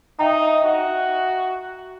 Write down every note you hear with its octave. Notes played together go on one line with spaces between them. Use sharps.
D#4 E5 G5 A#5
F#4